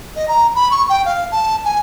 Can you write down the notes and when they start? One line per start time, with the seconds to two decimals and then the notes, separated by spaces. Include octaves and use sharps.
0.16 D#5
0.28 A#5
0.55 B5
0.71 C#6
0.89 G5
1.05 F5
1.32 A5
1.65 G#5